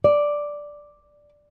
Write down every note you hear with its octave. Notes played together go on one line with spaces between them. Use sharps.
D5